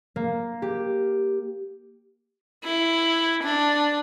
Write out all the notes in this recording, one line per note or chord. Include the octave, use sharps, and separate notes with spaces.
A#3
G4
E4
D4